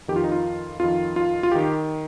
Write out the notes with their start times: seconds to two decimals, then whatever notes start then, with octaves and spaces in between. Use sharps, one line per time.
0.08 F2 D#3 G4
0.16 F4
0.24 D#4
0.32 F4
0.79 F2 D#3 F4
1.16 F4
1.43 F4
1.52 D#3 G4